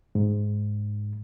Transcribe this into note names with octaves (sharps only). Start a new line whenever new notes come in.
G#2